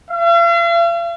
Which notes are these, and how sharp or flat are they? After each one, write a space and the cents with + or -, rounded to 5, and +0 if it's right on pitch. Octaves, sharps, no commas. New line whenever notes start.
F5 -45